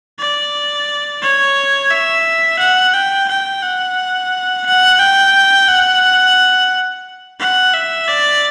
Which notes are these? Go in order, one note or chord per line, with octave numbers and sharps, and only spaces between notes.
D5
C#5
E5
F#5
G5
G5
F#5
F#5
G5
F#5
F#5
E5
D5